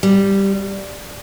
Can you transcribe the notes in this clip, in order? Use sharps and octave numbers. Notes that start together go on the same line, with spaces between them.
G3